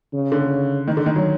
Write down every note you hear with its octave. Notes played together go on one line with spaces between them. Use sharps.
C#3
D3
D#3
D3
D#3
F#3